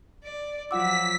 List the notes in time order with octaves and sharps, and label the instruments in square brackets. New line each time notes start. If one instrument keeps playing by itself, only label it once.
[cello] D5
[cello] F3 F#3 [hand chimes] F4 F#5 D6 [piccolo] E6 [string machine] B6